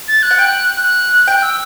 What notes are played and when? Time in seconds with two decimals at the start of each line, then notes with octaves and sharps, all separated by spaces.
0.08 A6
0.23 F#6
0.31 F#5
0.38 G5 F#6
0.83 F#6
1.27 G5 F#6
1.42 E6